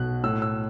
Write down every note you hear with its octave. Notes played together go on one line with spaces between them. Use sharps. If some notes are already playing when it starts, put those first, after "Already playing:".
Already playing: B1 B2 F#6
A2 E6
E6